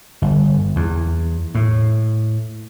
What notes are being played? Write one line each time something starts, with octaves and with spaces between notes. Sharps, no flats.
G1
E2
A2